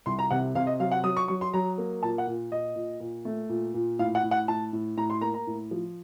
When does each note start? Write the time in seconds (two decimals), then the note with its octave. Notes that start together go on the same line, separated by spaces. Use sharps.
0.06 C2 C6
0.19 A#5
0.31 C3 F#5
0.55 C3 F5
0.67 D#5
0.79 F#3 F5
0.91 F#5
1.04 F#3 D#6
1.17 C#6
1.28 F#3 C#6
1.41 C6
1.53 F#3 A#5
1.78 A#3
2.03 A#2 A5
2.18 F#5
2.27 A#2
2.51 A#2 D#5
2.76 A#2
3.00 A#2
3.25 A3
3.49 A#2
3.74 A#2
3.99 A2 F5
4.15 F#5
4.23 A2
4.31 F#5
4.48 A2 A5
4.73 A2
4.97 A2 A#5
5.10 C6
5.21 A#3 A#5
5.34 A#5
5.47 A2
5.71 F3